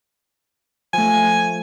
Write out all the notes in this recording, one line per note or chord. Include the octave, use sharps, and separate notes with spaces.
F3 A3 G#5